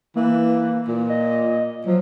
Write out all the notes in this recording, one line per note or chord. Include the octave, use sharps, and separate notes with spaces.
E3 A#3
A#2
D#5
F3 F#3